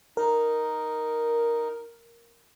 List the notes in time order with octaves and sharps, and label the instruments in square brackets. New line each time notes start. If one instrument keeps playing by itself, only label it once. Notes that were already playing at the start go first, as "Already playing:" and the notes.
[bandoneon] D#4 [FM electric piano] A#4